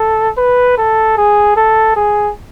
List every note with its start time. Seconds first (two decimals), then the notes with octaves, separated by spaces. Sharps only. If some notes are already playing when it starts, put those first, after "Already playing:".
Already playing: A4
0.38 B4
0.77 A4
1.17 G#4
1.57 A4
1.96 G#4